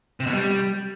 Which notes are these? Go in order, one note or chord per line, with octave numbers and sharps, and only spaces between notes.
C3
B2
G3